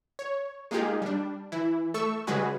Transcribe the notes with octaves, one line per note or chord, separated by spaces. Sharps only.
C#5
G#3 A#3 D#4 F4 G4 G#4
G3 D4
E3 E4
A3 A4 C#6 E6
C#3 G3 G#3 F#4 G#4 B4